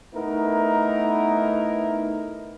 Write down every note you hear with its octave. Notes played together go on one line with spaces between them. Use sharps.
A3 B3 D#4 E4 A#4